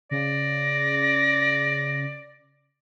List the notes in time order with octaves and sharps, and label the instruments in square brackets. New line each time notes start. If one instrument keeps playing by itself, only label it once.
[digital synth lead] C#3 [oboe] D5 [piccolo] A#6